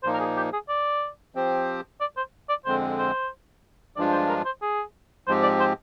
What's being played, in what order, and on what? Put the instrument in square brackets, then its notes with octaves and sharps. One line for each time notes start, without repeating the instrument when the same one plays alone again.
[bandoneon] A#2 F3 A#3 D#4 [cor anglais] C5
[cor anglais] A#4
G#4
G4
G#4
D5
[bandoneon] F3 C4 G4 C5
[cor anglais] D5
C5
D5
[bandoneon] F2 D3 G#3 C4 [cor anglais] C5
[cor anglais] C5
[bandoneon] G2 F3 G#3 D4 F4 [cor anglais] D5
[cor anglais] C5
A#4
C5
G#4
[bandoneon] G#2 F3 G#3 C4 G4 [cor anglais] C5
[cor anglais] D5
C5